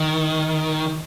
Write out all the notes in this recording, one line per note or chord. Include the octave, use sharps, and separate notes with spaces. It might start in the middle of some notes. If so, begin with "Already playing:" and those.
Already playing: D#3